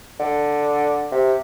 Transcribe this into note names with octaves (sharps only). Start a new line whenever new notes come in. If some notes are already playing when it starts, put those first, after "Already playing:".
D3
C3